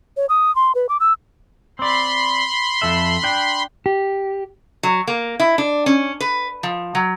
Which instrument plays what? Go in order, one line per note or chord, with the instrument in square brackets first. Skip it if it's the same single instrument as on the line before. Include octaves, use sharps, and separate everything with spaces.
[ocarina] C#5
D#6
C6
B4
D6
E6
[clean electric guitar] C4 D5 [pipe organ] B5 C6
[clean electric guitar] F2 A4 E5
D4 G5
[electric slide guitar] G4
[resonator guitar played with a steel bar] F#3
A#3
E4
D4
C#4
B4
F3
F#3